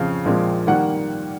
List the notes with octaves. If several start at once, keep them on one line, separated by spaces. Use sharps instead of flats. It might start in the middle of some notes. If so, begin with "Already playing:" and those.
Already playing: F2 C#3 F3 F5
A#1 A#2 F3 G#3
D#3 G3 A#3 F#5